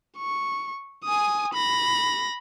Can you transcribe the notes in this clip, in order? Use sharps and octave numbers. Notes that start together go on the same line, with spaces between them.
C#6
G#5 D#6
B5 A#6